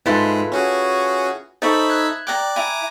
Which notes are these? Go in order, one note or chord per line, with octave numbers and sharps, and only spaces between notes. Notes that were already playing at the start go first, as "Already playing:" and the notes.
G#2 G#3 E4 F4 A4 B4 C6
C#4 F#4 G#4
D#4 A4 C5 E5 B5 C#6
F#6 G#6
D5 G5 A#5 D6 F#6
E4 G#5 A#5 D6